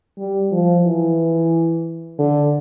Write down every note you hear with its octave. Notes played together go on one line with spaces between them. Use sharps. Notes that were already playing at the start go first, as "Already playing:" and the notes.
G3
F3
E3
D3